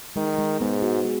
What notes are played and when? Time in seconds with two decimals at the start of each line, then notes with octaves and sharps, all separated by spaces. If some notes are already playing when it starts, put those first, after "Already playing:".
0.16 D#3 G#3
0.38 G#3
0.61 G#2 B3
0.82 F#4
1.05 G#4